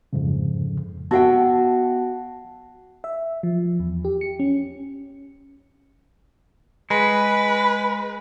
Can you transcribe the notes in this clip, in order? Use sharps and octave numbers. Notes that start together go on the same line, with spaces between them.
F2 G#2 C#3
B3 F#4 E5 F#5 G5 A5
E5
F3
E2
G4
C#7
C#4
G#3 B4